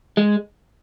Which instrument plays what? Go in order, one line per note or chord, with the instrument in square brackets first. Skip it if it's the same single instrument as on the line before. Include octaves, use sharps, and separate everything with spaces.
[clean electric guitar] G#3